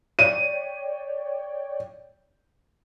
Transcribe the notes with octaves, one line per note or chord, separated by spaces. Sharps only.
C#5 D5 G5 D#7